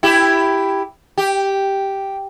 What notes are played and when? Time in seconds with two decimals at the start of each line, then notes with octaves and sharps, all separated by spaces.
0.03 E4 G4
1.18 G4